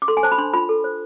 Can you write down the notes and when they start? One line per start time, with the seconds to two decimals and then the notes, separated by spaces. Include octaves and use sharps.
0.02 D6
0.08 A4 C6
0.17 G#5
0.23 C5 A5
0.32 B5
0.38 D4 C6
0.54 F4 B5
0.69 A4
0.84 C5